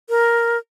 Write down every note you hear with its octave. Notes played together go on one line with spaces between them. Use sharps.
A#4